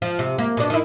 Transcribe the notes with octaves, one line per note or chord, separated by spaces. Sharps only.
F3
C3
A#3
B2 D4
D#3 E4